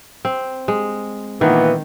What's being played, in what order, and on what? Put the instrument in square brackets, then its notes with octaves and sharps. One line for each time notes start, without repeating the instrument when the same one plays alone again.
[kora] C4
G#3
[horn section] A#2 E3 B3 [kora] D#3